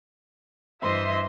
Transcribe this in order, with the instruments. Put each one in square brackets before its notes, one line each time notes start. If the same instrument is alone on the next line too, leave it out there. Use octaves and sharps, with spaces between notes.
[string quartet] G2 E3 [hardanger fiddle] C5 [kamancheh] D#5 C6 [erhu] E5